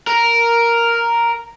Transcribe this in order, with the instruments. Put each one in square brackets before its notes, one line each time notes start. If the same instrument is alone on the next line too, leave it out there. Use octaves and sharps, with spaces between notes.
[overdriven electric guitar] A#4